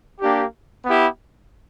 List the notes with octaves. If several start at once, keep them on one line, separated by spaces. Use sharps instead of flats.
A#3 D4 G4
B3 E4 G4